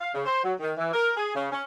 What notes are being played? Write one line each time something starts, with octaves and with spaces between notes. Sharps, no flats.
F5
C#3
C5
F#3
D#3
E3
A#4
G#4
C#3
C#4